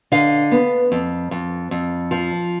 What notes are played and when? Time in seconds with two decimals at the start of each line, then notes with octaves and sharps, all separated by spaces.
0.12 D3 D#5 F5
0.52 B3
0.92 F2
1.31 F2
1.71 F2
2.11 F3